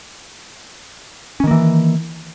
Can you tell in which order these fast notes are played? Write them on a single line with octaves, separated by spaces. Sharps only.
C#4 D#3 A#3 E3